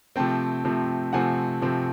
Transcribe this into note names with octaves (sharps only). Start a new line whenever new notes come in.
C3 F3 A3 C4 G5 A5
C3 F3 A3 C4
C3 F3 A3 C4 F#5 G#5
C3 F3 A3 C4